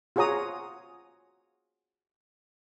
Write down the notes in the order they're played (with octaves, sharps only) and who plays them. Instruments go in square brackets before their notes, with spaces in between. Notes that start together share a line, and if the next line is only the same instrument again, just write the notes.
[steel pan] F4 F#4 G#4 C#5 A#5 D#6